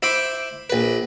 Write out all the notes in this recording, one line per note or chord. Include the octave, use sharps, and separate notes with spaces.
E4 C5 E5 D6
A#1 B4